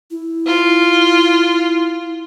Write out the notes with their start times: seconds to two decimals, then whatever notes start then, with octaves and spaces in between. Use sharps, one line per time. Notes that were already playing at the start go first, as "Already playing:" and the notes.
0.11 E4
0.47 F4